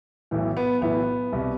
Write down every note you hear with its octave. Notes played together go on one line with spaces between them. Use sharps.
B1 A2 E3
B3
B1 A2 E3 B3
C2 B2